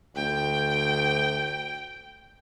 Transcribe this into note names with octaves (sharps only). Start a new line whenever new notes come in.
D2 G5